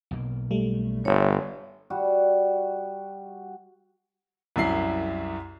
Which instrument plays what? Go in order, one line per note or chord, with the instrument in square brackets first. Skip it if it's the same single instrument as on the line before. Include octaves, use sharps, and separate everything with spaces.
[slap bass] B1 B2 A#3
[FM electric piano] G3 A3
[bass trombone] G1 [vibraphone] C#5 E5
[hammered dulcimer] G3 F#4
[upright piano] C2 F#2 E4 C7